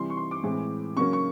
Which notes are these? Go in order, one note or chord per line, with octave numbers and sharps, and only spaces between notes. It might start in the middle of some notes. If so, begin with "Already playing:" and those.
Already playing: C3 E3 G3 C6
C#6
C6
D6
A2 E3 G#3 C4
C#3 F#3 A#3 C#4 C#6
C#6